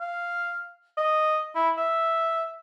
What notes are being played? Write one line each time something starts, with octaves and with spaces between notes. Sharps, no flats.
F5
D#5
E4
E5